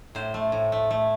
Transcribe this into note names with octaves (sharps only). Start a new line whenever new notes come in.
A2 C5
A3
A2
A3
A3